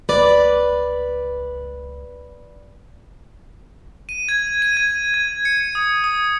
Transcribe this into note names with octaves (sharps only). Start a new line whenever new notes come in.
C#2 B4 D5
D#7
G#6
D#7
G#6
G#6
C#7
D#6
D#6